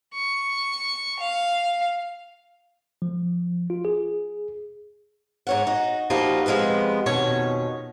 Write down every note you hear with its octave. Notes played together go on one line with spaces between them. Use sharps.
C#6
F5
F3
F4
G#4
G#2 C#5 F#5
D#4 F#4
F3 G3 A#3 D#4 F4 F#4
C3 F3 G#3 B3 B4
F2 B2 D#3 C#4 C#5